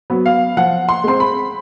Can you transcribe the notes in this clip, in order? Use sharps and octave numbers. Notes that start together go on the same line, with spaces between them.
F#3 B3
F5
F3 F#5
C6
G#3 C4 C6
B5